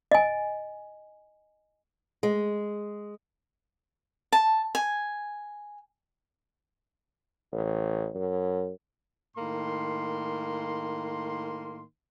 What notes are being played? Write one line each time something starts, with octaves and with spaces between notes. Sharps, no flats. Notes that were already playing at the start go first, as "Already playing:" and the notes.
D#5 G#5
G#3
A5
G#5
A1
F#2
A2 D#3 A#3 C6